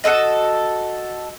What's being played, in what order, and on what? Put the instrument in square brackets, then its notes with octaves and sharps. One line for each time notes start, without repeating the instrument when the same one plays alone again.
[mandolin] F#4 A4 B4 D#5